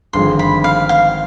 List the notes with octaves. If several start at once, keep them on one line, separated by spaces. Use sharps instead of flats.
G#1 G2 D3 F3 G#3 C6
B5
F5
F5